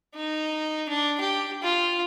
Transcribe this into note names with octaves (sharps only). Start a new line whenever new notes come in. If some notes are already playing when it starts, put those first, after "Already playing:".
D#4
D4
G4
F4